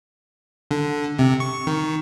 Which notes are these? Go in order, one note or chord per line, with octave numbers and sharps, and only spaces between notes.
D3
C3
C#6
D#3